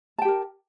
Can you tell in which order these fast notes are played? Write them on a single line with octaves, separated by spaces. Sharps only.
A5 G5 G4 A#4